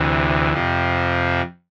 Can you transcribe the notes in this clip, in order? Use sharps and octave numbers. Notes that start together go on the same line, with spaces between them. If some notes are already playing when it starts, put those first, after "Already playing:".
Already playing: D2 C3 E3
F2 C3 F3